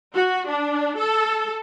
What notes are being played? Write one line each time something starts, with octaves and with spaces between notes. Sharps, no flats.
F#4
D4
A4